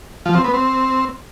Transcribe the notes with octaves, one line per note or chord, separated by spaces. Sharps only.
F3
C4
B3
C4